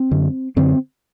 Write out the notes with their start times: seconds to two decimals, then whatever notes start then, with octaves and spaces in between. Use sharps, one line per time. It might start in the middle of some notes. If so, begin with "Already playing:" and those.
Already playing: C4
0.11 F#2 D3
0.56 F#2 D3 C4